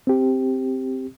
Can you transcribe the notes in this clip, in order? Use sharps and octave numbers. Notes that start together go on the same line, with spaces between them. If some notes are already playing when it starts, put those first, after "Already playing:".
C4 G4